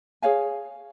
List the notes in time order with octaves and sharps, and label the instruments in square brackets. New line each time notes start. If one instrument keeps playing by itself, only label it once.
[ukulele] G#4 C#5 F5 G#5